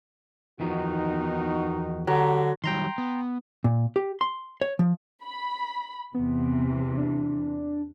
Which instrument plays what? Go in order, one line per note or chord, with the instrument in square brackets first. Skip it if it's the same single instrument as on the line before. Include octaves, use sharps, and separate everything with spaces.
[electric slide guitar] E2 F3 B3 [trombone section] D#3 D#4 F#4
[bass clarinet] D3 [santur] F#3 [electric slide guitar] G4
[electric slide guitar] D#3 F#3 G3 [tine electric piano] G5 A#5 C6
[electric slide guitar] B3
[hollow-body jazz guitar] A#2
G4
C6
C#5
F3
[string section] B5
[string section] E2 C3 E3 [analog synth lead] B3
[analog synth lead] D4